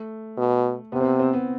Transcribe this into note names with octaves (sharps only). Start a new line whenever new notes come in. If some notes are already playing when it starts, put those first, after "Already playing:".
Already playing: A3
B2
C3 B3
C4
B3
C4
B3